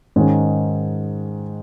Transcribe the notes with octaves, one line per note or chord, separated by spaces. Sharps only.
G#2 D#3 G#3 C#4